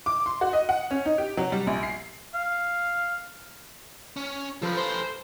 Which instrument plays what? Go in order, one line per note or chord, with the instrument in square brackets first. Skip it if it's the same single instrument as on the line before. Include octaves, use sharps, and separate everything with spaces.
[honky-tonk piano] D6
C6
F#4
D#5
F#5
C#4
D#4
G4
F#3
G3
A#1
C7
[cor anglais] F5
[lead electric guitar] C#4
[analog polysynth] F3 [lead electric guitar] A4 B4
[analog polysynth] C5